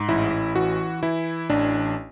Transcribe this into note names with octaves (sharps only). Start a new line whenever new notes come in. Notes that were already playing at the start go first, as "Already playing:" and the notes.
Already playing: G#2
A1 E4
E3 F#4
E3 E4
A1 D4